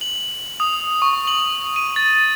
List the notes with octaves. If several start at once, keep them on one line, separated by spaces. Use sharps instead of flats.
F#7
D#6
C#6
F#7
D#7
A6